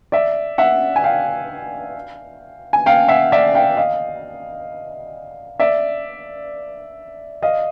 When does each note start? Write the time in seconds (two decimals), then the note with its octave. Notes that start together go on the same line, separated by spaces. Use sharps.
0.12 D5 E5
0.58 E5 F#5
0.96 G#5
1.04 F5 G5
2.73 G#5
2.86 F5 G5
3.08 E5 F#5
3.32 D5 E5
3.54 F5 G5
3.77 D#5 F5
5.60 D5 E5
7.42 D#5 F5